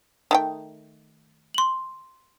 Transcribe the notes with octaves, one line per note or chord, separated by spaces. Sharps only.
D#3 A3 G5
C6 F#7